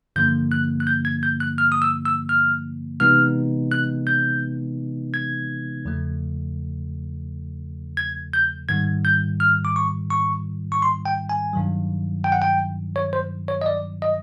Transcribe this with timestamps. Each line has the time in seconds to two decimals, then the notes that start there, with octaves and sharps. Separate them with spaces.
0.16 G2 D3 F3 A#3 G6
0.52 F#6
0.80 F#6
0.87 G6
1.05 G#6
1.23 G6
1.40 F#6
1.58 F6
1.72 D#6
1.82 E6
2.05 E6
2.29 F6
3.00 C3 E3 G#3 B3 D#4 F6
3.72 F#6
4.07 G6
5.14 G#6
5.85 E2 C#3 F3 A3
7.97 G#6
8.33 G6
8.69 G#2 D#3 G3 G#6
9.05 G6
9.40 F6
9.65 D6
9.76 C#6
10.10 C#6
10.72 C#6
10.82 C6
11.06 G5
11.29 G#5
11.53 G2 D#3 F#3
12.24 G5
12.32 F#5
12.42 G5
12.96 C#5
13.13 C5
13.48 C#5
13.62 D#5
13.66 D5
14.02 D#5